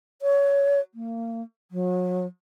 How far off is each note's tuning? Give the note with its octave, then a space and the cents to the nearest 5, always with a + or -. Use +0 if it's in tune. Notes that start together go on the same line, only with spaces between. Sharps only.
C#5 +20
A#3 -30
F#3 -35